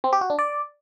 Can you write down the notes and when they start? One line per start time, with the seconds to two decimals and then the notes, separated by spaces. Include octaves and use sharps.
0.04 C4
0.13 G4
0.21 F#4
0.30 D4
0.39 D5